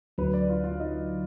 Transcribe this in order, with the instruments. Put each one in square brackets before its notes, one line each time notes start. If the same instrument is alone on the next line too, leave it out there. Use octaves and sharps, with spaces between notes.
[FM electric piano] D2 D3 F#3 [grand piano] B4
[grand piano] D5
F4
F4
D#4